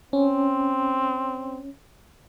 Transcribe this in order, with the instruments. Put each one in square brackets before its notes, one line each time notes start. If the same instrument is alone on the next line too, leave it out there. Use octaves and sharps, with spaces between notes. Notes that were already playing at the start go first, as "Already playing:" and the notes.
[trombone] C4 [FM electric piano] C#4